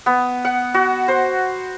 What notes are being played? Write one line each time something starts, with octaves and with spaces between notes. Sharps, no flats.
B3
F#5
F#4
C5